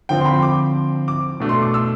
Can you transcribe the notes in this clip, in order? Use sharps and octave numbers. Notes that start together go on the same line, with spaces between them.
D3 F3 C4 G5
C6
B5
C6
D6
D6
B2 A3 D4
C6
D6
E6